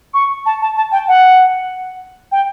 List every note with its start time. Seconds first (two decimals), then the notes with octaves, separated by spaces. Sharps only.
0.14 C#6
0.46 A5
0.61 A5
0.77 A5
0.92 G5
1.08 F#5
2.32 G5